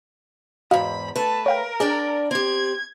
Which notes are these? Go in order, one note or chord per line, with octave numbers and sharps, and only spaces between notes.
E2 G#2 F#4 D#5 F5 B5
A3 B4 A5
A#4 C#5 F5 G5
D4 G#4 D5 G5
C4 G4 G#6